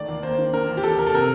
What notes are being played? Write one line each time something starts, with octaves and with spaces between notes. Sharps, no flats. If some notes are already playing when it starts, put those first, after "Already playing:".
Already playing: D#3 A3 D5
D#2
A#3 C5
D#3
D#3 A#4
D#2
G4
D#2 A4
D#2 A#4
A4
C3 A#4